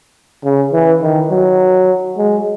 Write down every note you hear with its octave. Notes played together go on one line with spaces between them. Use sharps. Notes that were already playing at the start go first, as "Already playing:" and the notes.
C#3
E3
D#3
F#3
G#3